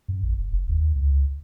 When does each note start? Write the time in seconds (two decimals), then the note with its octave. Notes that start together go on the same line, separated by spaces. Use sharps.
0.08 F#2
0.23 A1
0.39 F#1
0.53 F#1
0.69 D#2
0.95 C#2